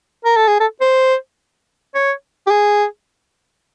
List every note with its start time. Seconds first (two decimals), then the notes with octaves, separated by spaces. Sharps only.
0.25 A#4
0.36 A4
0.48 G#4
0.60 A4
0.81 C5
1.95 C#5
2.47 G4
2.51 G#4